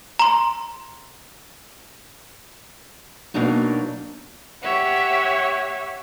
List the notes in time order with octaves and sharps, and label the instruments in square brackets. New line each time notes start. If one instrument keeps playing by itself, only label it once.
[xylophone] A#5 C6
[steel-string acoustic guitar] B2 F#3 A#3 D4 D#4
[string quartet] G4 C#5 E5 F#5